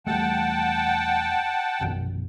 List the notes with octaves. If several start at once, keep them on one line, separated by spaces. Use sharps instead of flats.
E1 G3 A3 F#5 G5 A5
A#1 F#2 B2